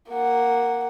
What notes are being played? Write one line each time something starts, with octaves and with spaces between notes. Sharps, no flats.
A#3 F#5